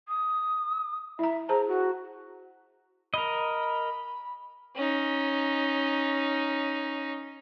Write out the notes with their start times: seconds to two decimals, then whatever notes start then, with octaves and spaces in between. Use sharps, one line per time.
0.09 D#6
1.19 E4 E5 A#5
1.49 G#4 C5 A5 A#5
1.68 F#4
3.14 A#4 D#5 B5
4.76 C#4 D#4